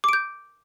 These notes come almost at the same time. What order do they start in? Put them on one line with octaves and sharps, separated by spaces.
D6 D7 G6